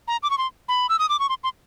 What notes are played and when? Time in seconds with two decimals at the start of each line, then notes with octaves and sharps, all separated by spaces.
0.08 A#5
0.23 D6
0.30 C#6
0.38 C6
0.68 B5
0.89 E6
0.99 D#6
1.09 D6
1.19 C#6
1.29 C6
1.44 C6